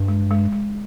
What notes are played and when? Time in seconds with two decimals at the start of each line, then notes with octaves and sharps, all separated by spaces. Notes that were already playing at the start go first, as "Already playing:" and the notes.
Already playing: G2
0.08 G#3
0.31 G#3
0.53 G#3